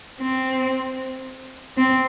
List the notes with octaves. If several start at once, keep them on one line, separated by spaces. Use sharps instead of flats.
C4
C4